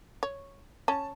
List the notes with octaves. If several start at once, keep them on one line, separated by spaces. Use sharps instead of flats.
C#5
C#4 A5